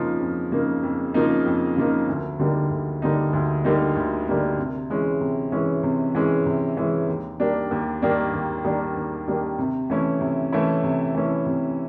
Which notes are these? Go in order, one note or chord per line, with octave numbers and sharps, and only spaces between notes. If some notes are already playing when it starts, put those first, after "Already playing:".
Already playing: F2 C#3 F3 A#3 D#4
F2
C#3 F3 A#3 D#4
F2
C#3 F3 A#3 D#4
F2
C#3 F3 A#3 D#4
D2
D3 G3 A#3 D#4
D2
D3 G3 A#3 D#4
D2
D3 G3 A#3 D#4
D2
D3 G3 A#3 D#4
C3
E3 G#3 C#4
C3
E3 G#3 C#4
C3
E3 G#3 C#4
C3
E3 G#3 C#4
D#2
D#3 G3 A#3 D4
D#2
D#3 G3 A#3 D4
D#2
D#3 G3 A#3 D4
D#2
D#3 G3 A#3 D4
C3
E3 A3 C#4 E4
C3
E3 A3 C#4 E4
C3
E3 A3 C#4 E4
C3